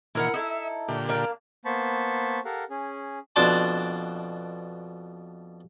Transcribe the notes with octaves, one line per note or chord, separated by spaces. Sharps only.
A#2 D#3 E3 E4 A#4 F#5
D#4 E4 A4 E5
A#2 D3 G4
A#3 D4 F5
A#3 B3 C5 A5 B5 C#6
G4 A4 A#4 F5 F#5
C#4 G#4
F2 B2 D4 C5 D5 A5